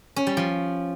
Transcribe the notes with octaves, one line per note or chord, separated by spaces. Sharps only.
C#4
G3
F3